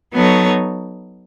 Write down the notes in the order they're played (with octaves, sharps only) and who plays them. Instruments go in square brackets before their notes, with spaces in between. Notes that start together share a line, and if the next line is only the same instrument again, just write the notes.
[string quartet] F#3 B3 D#4 A4 C#5